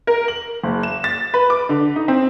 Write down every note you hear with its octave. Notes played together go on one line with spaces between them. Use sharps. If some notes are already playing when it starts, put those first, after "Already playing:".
A#4
F#7
F#1
E7
A6
B4
D6
D3
D#4
C4